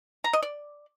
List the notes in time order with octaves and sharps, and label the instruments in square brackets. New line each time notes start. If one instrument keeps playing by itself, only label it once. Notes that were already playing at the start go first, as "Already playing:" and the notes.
[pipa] A#5
D#5
D5